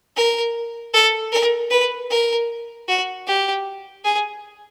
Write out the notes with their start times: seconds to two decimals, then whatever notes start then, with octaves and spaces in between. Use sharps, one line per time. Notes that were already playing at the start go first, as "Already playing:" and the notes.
0.16 A#4
0.94 A4
1.32 A#4
1.71 B4
2.10 A#4
2.88 F#4
3.27 G4
4.05 G#4